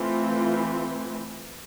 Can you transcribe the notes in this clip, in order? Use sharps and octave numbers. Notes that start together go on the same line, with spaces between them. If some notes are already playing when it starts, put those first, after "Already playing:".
Already playing: E3 A3 C4 F4